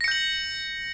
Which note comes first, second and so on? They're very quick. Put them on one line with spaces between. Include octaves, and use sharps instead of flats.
A#6 C#7 G6 F#7